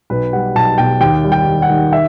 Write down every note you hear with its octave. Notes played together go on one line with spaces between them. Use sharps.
B1 B4
G3 F#5
B1 A5
B2 G5
D#2 G5
G3
G5
D#2
F#5
D#3
E5